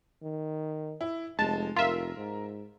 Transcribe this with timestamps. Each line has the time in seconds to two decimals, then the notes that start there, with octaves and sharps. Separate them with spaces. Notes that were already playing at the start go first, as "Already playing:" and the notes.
0.23 D#3
1.01 E4
1.39 F1 G#3 A5
1.76 F1 F4 A#4 E5
2.17 G#2